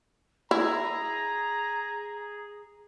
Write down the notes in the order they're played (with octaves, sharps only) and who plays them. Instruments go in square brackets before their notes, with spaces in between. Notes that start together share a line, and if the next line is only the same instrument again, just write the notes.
[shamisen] E4 [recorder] G#4 [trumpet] A#5